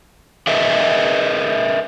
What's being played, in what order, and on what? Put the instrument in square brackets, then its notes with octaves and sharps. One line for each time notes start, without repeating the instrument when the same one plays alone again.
[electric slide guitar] G#4 A#4 B4 D#5 E5